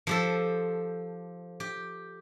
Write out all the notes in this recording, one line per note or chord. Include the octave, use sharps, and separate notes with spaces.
F3 G4 A4
G4